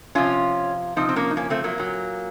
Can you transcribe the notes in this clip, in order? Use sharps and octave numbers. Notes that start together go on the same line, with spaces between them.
C3 F3 C#4 F4
C3 F3 C4 D#4
C4
A#3 C#4
D#4
A#3 C#4
A3 C4
F#3 A#3
A#2 F#3